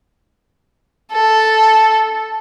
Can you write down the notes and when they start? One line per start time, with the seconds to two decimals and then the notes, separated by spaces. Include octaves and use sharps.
1.12 A4